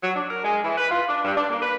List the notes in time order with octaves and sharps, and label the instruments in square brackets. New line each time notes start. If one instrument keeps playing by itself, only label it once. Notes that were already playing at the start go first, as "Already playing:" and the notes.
[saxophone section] F#3
D4
A#4
G#3
E3
B4
F4
D4
G2
D4
A#3
B4